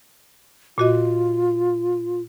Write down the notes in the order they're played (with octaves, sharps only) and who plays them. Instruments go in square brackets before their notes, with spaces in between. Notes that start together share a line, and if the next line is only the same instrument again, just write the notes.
[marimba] A#2 F#4 D#5 [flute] F4